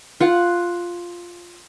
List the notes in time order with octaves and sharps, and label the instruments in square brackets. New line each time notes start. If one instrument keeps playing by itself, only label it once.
[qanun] F4 F#5